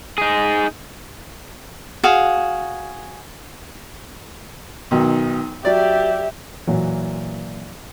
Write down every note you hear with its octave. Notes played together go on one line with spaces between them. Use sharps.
D#4 G#4
F#4 G#4 F5
B1 D#3 F#3
F#3 G4 D5 E5
A#2 E3 F#3